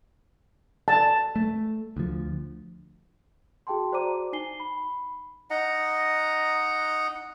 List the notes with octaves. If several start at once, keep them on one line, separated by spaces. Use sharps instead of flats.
A5
A3
D2 F3
F#4 G#4 G5 A5 C6
F#4 C5 D5 A#5 D6 D#7
D#4 G#5 C7 G7
B5
D#4 D#5 F#5 A#5